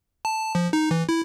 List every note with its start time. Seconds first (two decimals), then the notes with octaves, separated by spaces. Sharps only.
0.25 A5
0.55 F3
0.73 D#4
0.91 E3
1.09 E4